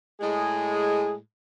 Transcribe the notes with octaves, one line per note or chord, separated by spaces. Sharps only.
A2 G#3 G#4